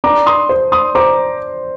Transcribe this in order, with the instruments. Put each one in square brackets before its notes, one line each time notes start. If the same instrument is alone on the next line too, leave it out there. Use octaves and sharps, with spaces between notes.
[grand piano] D4 [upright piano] A#5 D6
[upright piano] C6 D#6
[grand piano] C5
[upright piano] C6 D#6
[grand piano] C5 [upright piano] A#5 D6